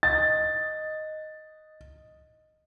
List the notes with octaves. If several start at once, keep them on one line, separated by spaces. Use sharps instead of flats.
D#5 A6